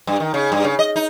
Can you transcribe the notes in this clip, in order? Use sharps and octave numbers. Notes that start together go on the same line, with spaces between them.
G2
D#3
C#3
G2
C#3
D#5
D#4